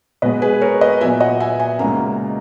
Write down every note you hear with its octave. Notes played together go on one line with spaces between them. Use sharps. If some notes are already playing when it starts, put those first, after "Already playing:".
B2 G#3 B3 B4 D#5
G#4 B4
A#4 C#5
B4 D#5
A#2 F#3 B3 E5 G#5
D#5 F#5
E5 G#5
E5 G#5
C#2 B2 A#3 C#4 F#5 A#5